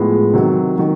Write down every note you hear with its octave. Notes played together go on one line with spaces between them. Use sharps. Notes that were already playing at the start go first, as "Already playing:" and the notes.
Already playing: A2 F3 G#3 B3
C3 D#3 F#3
D#3 F#3